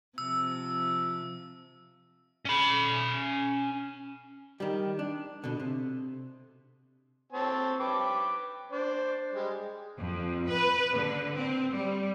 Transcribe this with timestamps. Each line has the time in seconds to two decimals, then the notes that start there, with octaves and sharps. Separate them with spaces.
0.18 C3 F3 E6
2.45 C#4 B5
4.60 D#3 G3
4.99 D4
5.44 B2 D3
5.60 C3
7.32 C4 C#5 A5
7.80 B4 G5 D6
8.72 D4 C5 D5
9.33 G3 G#3
9.98 F2
10.47 B4
10.95 D3
11.36 C4
11.72 G3